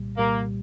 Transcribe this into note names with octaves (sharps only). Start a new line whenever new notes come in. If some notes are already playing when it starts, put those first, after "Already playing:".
Already playing: C2 A#2 G3
C2 A#2 G3 A#3